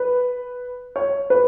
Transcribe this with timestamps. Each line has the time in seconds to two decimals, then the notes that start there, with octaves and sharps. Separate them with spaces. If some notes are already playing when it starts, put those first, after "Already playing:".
Already playing: B4
0.96 C#5
1.30 B4